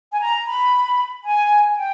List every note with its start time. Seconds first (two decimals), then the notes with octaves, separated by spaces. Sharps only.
0.12 G#5
0.21 A#5
0.47 B5
1.25 G#5
1.77 G5